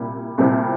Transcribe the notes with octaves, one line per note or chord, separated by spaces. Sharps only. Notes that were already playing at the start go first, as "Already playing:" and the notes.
Already playing: C2 A#2 G3 E4
C2 A#2 G3 C4 E4